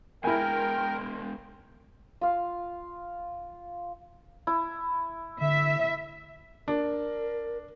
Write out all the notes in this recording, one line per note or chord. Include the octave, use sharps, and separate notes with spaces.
E2 G#3 E4 A#4 G5 G#5
F4 F5
E4
D3 E5
D4 A#4